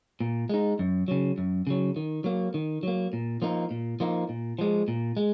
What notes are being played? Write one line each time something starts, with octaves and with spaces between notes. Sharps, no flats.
A#2
G#3 D#4
F#2
C#3 F#3
F#2
C#3 F#3
D#3
F#3 A#3
D#3
F#3 A#3
A#2
F3 A#3 D#4
A#2
F3 A#3 D#4
A#2
F3 G#3
A#2
G#3